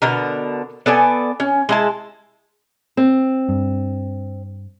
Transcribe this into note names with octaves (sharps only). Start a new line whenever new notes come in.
B2 D3 A#4
B3 A4 D5 G#5
C#4
G#3 E4 A5
C4
G2